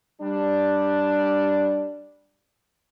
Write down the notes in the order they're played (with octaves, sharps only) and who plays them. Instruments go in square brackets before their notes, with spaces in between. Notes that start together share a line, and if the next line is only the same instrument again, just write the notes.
[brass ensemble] G3 D4